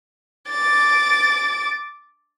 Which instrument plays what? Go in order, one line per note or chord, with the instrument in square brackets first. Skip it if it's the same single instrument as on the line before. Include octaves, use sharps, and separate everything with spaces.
[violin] D6 A6